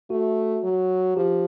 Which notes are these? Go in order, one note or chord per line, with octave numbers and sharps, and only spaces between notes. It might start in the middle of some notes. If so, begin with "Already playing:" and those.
A3 F#4
F#3
F3 G4